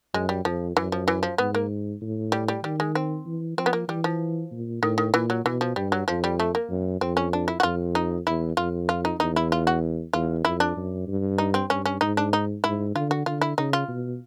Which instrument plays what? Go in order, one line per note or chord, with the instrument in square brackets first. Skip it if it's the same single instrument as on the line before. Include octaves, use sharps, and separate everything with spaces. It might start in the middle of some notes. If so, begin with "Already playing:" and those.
[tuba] F#2 [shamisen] G#3
[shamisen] G3
[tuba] F2 [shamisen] F3
[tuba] F#2 [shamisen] E3
[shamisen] F3
E3
F3
[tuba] G#2 [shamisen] B3
[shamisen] A#3
[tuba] A2
[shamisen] G3
G3
[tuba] D#3 [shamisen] G3
[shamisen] G#3
C4
[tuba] E3
[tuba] F3 [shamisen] C4
[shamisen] B3
A#3
[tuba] E3 [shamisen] G3
[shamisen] F3
[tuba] A#2
[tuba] A2 [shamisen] D#3
[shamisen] D#3
[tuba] A#2 [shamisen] E3
[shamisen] F#3
[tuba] B2 [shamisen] E3
[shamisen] F3
[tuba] G2 [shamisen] G3
[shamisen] F#3
[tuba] F2 [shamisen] F3
[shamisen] G3
A3
A#3
[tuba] F#2
[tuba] F2 [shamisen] C4
[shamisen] C#4
D4
E4
F#4
[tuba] F2 [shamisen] F4
[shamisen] D#4
[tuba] E2 [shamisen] E4
[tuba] F2 [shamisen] F4
[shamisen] F4
D#4
[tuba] E2 [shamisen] D#4
[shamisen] E4
F4
F#4
[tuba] E2 [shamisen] F4
[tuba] F2 [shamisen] E4
[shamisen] D4
[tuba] F#2
G2
[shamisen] D#4
C4
[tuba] G2 [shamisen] C#4
[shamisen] C#4
[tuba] G#2 [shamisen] D#4
[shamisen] D4
D#4
[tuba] G#2 [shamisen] E4
[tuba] D3 [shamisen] F4
[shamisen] F#4
[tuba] D3 [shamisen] F4
[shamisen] E4
[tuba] C#3 [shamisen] D#4
[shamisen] F4
[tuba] B2